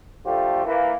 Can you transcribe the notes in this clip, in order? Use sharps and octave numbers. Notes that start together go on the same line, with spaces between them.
D3 F3 A3 F4 G4
E3 A#3